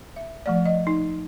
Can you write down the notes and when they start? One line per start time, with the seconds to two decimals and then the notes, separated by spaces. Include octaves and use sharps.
0.16 E5
0.46 F3 A3 D5
0.66 D#5
0.87 D#4